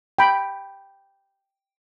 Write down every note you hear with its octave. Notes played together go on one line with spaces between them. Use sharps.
G5 B5